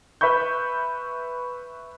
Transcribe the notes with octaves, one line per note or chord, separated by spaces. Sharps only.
B4 E5 B5 C#6 G6